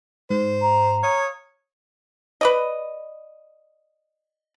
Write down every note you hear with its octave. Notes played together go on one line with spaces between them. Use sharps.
G#2 C5
A#5
C#5 F5 D#6 G#6
B4 D5 D#5